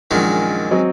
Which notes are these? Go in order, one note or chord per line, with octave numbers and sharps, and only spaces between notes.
A#1 F#2 D#3 G#3
F#3 C4 D#5